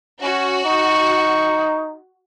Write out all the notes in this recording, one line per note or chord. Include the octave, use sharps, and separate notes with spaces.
C#4 F#4
D#4 C#6